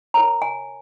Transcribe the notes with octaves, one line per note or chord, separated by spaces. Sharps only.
F4 A#4 C#5 A#5
G#5